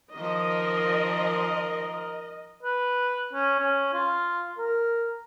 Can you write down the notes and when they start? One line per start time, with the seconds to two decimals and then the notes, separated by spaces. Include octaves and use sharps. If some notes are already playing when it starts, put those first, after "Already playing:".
0.14 D#3 F3 A#4 D#5
2.63 B4
3.33 C#4
3.60 C#4
3.94 F4
4.58 A#4